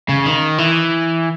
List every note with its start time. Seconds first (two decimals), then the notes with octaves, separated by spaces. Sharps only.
0.09 C#3
0.26 D#3
0.58 E3